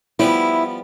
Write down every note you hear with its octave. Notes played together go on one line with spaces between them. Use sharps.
F3 G3 B3 E4